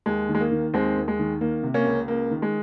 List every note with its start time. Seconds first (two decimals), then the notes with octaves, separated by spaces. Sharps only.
0.06 D#2 G#3
0.29 D#3
0.35 G#3
0.40 A#3
0.51 D#3
0.74 D#2 G#3 C4
0.96 D#2
1.08 G#3
1.19 D#3
1.41 D#3 A#3
1.63 C3
1.74 A#3 C#4
1.87 C#2
2.08 C#2 A#3
2.31 D#3
2.42 G#3